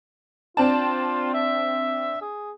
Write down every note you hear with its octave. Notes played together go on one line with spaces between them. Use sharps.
C4 D4 F4 A5
E5
G#4